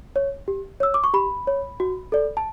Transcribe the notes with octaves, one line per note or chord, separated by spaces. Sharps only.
C#5
G4
C#5 E6
D6
C#6
G4 B5
C#5
F#4
A4 D5
A5